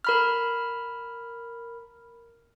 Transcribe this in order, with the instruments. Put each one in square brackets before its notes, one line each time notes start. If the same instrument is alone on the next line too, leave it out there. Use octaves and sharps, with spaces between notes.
[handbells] A#4 B5 F6